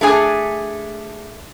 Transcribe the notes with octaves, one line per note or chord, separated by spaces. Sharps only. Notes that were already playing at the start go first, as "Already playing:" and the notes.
A3 D4 G#4 G#5